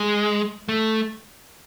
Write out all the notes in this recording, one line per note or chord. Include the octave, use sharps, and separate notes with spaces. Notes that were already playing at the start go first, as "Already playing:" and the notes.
Already playing: G#3
A3